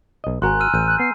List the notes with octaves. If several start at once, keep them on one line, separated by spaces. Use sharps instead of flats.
B1 D#5
G#1 F#4 A#4 G#5 A#5 C6 F#6
E6 F6 D#7
A1 G6 D#7
F#6
B3 C7